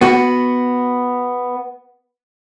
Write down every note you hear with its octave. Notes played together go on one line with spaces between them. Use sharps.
B3 F#4